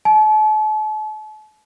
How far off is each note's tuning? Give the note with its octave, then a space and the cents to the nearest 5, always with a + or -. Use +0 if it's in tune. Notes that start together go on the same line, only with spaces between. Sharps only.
A5 -40